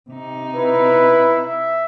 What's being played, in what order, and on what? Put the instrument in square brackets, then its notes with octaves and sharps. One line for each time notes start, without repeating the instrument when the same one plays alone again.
[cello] C3 D#4
[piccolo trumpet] E4 [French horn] B4
[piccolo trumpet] E5